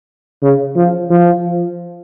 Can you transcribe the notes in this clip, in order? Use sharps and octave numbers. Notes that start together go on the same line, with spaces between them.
C#3
F3
F3